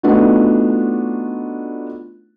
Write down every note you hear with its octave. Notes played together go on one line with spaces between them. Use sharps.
A3 B3 D4 D#4 F4 F#4